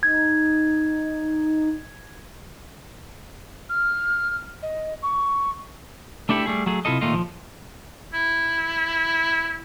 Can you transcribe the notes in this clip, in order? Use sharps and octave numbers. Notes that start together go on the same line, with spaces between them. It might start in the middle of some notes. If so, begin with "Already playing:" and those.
D#4 G#6
F6
D#5
C#6
A3 D4 E4 G4 A4
G3 A3 G#4
F#3 A3 G#4
C3 E4 F4 A4 D#5
D#2 A#2 A3 F4 D#5
F3
E4